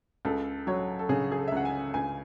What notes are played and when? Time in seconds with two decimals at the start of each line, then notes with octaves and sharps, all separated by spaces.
0.25 C#2 A4
0.67 F#3 C#5
0.99 A4
1.09 C#3 G#4
1.32 G#4
1.38 A4
1.48 E5
1.52 C#2 F#5
1.65 G#5
1.94 C#2 G#5